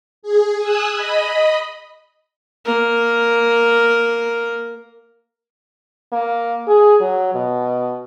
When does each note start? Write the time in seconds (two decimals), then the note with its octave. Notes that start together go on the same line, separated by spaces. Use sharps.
0.23 G#4
0.58 G#5 D#6 E6 F#6
0.94 D#5 B5
2.65 A#3 A#4
6.12 A#3
6.67 G#4
7.01 F#3
7.34 B2